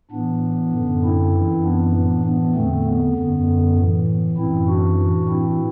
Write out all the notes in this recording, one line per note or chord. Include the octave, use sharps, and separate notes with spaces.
A2 E3 B3 D4
F#2 D3
C4 E4
F#2 E3
B3 D4
A2 E3
B3
E2 D3 A3 C4
B3
F#2 D3 B3
A2 E3
F#2 E3 C4 E4
D4 F#4
A2 E3
C4 E4